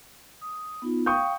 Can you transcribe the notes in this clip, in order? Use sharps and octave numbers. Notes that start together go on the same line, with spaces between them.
D#6
B3 D#4 F4
F5 G5 C#6 D#6 G6